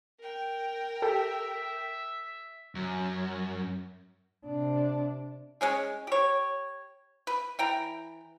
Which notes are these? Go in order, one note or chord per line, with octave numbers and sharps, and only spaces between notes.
A#4 G5
G4 A4 E5
F#2
C3 D4
G#3 C#4 G#4
G4 C#5
B4
E3 G5 A#5